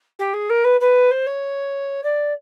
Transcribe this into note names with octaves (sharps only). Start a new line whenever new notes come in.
G4
G#4
A#4
B4
B4
C5
C#5
D5